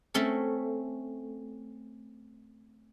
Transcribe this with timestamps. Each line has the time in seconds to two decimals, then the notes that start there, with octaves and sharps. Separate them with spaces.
0.14 A3 C4 C#4 A4